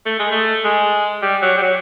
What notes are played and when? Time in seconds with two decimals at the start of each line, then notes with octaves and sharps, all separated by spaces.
0.06 A3
0.19 G#3
0.31 A3
0.64 G#3
1.23 G3
1.42 F#3
1.57 G3
1.62 F#3